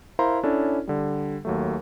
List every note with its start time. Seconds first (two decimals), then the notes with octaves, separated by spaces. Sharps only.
0.19 E4 A#4 C5 F5 A#5 C6
0.43 C#4 D4 E4 A4 C#5
0.87 D3 G3
1.45 D#2 F#3 A3